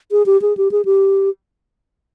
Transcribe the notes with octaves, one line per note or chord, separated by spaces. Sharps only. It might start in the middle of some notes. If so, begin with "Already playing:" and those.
G#4
G4
G#4
G4
G#4
G4